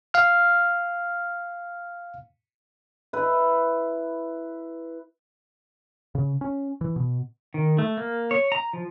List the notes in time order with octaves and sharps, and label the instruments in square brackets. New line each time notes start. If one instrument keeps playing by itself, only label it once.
[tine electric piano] F5 F6
[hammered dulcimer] E4 B4
[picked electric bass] C#3
C#4
E3
B2
[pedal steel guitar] D#3
A3
A#3
C#5
A#5
F3